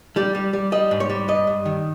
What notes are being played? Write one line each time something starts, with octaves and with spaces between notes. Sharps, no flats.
G3 G4
G3
G3
G3 D#5
G#2
C#5
G3
G2 D#5
G2
D#3